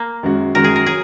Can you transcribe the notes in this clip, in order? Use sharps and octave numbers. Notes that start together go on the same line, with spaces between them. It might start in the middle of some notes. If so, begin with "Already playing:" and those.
Already playing: A#3
F#2 D#3 G#3 F#4
F#2 D#3 G#3 F#4 A#4
G#4
A#4
F#3 G#4